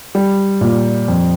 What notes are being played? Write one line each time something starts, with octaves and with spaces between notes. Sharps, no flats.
G3
A#2
F2